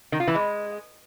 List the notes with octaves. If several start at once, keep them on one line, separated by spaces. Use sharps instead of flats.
D#3
F4
E3
G#3